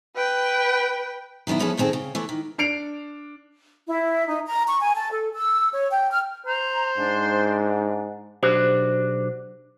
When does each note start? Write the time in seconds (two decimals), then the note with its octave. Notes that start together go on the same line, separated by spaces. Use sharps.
0.16 B4 G5
1.47 D#3 F#3 B3 D4 E4
1.59 D2 F3 B3 C#4 G#4 A4
1.77 G2 D#3 C4 G#4 A4
1.93 C#3
2.15 E3 A3 B3
2.29 D#3
2.58 D4 C7 D7 F7
3.87 E4
4.27 D#4
4.45 A#5
4.67 C#6
4.81 G#5
4.95 A5
5.11 A4
5.33 E6
5.71 C#5
5.90 G5
6.09 F6
6.46 C5 A#5
6.98 G#2 D4
8.43 B1 D4 F#4 G4 C5